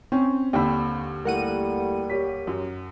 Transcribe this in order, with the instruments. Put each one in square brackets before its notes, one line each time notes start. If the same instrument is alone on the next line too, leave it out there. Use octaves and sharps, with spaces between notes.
[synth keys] C4 [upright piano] C#4 [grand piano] G5
[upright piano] D#2 D3 [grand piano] G5 B5 E6
[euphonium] G3 [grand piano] A3 E4 [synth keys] A#4 F#5 D#7
[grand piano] G4 C#5 B6
[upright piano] F#2